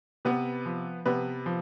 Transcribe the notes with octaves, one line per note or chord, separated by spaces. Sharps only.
C3 B3 B4
F3
C3 B3 B4
F3